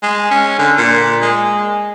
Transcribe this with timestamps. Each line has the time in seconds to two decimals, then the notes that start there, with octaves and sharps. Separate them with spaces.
0.03 G#3
0.31 C#4
0.58 D3
0.78 A#2
1.22 G#3